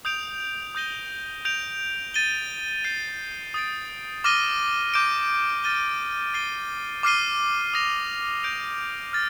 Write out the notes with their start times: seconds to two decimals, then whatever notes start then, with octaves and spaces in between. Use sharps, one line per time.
0.05 D#6 G6 D7 F7
0.75 D#6 G6 A#6 D#7 G7
1.45 G6 D7 F7
2.14 A6 D#7 G7
2.84 G6 C7 D#7
3.54 D#6 A6 D7
4.24 D6 F6 A#6 D#7 G7
4.94 D6 G6 D7
5.64 F6 A6 D#7 G7
6.34 A6 C7 D#7 G7
7.03 D6 F6 C7 D#7 G7
7.74 D#6 A#6 F7
8.43 G6 D7 F7
9.13 F6 A6